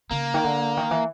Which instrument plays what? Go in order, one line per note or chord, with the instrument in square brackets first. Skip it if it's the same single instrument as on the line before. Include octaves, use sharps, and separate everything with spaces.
[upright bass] C#3 [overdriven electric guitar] A#3
[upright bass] D#3
D3
D#3
E3